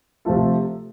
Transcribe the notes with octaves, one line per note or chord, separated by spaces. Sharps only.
C3 F3 A3 F4 A4